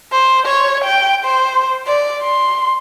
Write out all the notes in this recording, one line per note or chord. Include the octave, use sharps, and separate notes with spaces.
C5
C#5
G5
C5
D5
C6